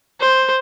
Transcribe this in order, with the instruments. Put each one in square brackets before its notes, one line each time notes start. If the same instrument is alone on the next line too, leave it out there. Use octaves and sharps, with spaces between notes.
[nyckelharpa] C5